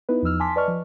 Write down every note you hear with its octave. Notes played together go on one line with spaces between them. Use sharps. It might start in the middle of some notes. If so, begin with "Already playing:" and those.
B3 D#4 E4 B4
E2 F3 D#4 E6 F6
G#5 A5 C6 D6 B6
B4 D5 D#5 A5 C#6 F6
F3